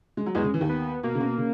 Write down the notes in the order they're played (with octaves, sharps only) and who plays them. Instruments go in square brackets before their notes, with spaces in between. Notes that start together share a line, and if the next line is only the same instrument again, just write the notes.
[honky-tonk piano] G#3
F#3
[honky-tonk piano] E2 E3 [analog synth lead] G#3
[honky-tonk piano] C#3
E3
D#2 D#3
[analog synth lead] B3
[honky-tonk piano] B2 [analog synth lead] A#3
[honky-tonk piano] C#3
B2
C#3